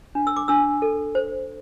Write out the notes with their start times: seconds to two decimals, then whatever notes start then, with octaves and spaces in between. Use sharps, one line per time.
0.15 D4
0.27 E6
0.36 D6
0.48 D4 E6
0.82 A4
1.15 C5